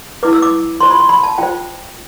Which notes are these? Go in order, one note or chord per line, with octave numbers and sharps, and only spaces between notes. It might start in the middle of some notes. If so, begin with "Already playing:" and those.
E4 B4 D6
E6
D6
F4 C5 C6
B5
C6
B5
A5
F4 C5 G5